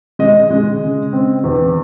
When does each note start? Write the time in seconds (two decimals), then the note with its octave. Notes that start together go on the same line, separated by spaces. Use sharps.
0.19 G#3 D#5
0.50 G#3
0.82 C#3
1.13 C4
1.44 E2